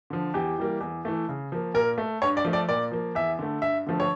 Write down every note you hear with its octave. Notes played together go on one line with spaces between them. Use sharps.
D3 F3
E2 G4
E3 G3 A#3
E2
E3 A3
C#3
F3 A#3
A#2 A#4
A3
G2 C#5
D5
F3 A3
D5
A#2 D5
F3 A#3
E2 E5
D3 A3
G2 E5
D3 F3 A3
C#5